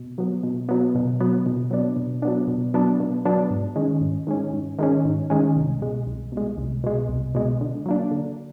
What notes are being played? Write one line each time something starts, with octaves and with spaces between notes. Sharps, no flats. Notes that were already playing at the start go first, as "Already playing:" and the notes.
Already playing: B2
F#3 B3
B2
F#3 B3
B2
F#3 B3
B2
F#3 B3 D4
B2
F#3 B3 D4
B2
F#3 B3 D4
B2
F#3 B3 D4
G#2
D#3 G#3 C#4
G#2
D#3 G#3 C#4
G#2
D#3 G#3 C#4
G#2
D#3 G#3 C#4
C2
B2 G#3
C2
B2 G#3
C2
B2 G#3
C2
B2 G#3
D3
F#3 A#3 D4
D3